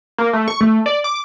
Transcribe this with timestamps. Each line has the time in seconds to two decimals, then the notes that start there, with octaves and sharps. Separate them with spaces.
0.18 A#3
0.33 A3
0.48 C#6
0.61 A3
0.86 D5
1.04 D6